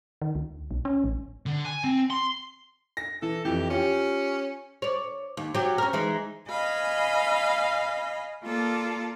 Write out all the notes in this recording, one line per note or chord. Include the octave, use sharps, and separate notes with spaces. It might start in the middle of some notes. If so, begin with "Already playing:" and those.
D#3
D2
B1
C#4
A1
D3
G#5
C4
C6
A#6
E3 A4
F2 E3 G4
C#4 F4 G4
C#5 D5
D#2
F#3 G4
C#4 A#4
E3 G#3 D#4
D#5 F5 G#5 B5
A#3 F4 A4 D5